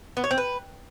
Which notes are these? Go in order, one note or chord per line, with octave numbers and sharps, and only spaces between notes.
B3
C#5
C4
B4